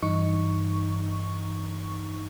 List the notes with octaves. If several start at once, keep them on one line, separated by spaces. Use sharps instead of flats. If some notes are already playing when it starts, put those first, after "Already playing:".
G2 E3 D#4 C#6